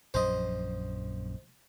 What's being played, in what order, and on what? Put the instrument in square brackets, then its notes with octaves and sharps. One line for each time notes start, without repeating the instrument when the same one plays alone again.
[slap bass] A#1 F#2 F3 [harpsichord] C5 D#5